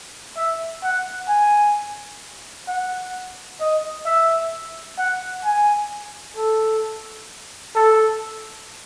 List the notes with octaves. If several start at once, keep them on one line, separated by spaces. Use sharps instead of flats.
E5
F#5
G#5
F#5
D#5
E5
F#5
G#5
A4
A4